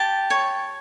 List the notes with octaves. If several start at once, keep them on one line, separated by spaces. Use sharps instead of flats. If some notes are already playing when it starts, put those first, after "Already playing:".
Already playing: G4 A5
C#5